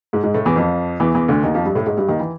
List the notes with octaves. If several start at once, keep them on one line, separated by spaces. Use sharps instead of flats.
G#2 G#3
G#2 G#3
A2 A3
E2 E3
F2 F3
E2 E3
E2 E3
D2 D3
D#2 D#3
F2 F3
G2 G3
A2 A3
G#2 G#3
G2 G3
D#2 D#3
E3